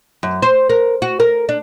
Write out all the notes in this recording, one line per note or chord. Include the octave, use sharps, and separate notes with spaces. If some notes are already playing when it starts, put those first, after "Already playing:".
F#2
C5
A#4
F#4
A#4
D4